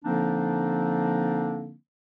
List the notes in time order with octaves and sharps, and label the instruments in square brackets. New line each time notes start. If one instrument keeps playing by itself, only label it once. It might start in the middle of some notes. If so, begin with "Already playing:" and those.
[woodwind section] D3 F3 A#3 C4 D4 D#4